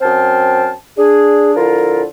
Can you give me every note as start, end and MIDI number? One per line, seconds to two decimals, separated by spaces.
0.01 0.71 42
0.01 0.71 60
0.01 0.71 72
0.01 0.71 79
0.01 0.71 81
0.01 0.71 89
0.97 1.54 62
0.97 1.54 68
1.56 2.03 50
1.56 2.03 53
1.56 2.03 64
1.56 2.03 65
1.56 2.03 69
1.56 2.03 70